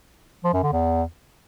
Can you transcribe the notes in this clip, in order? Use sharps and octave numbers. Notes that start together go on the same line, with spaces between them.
F3
F#2
D3
E2